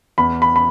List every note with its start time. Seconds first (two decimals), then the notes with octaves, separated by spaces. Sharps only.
0.18 E2 B5
0.42 B5
0.56 B5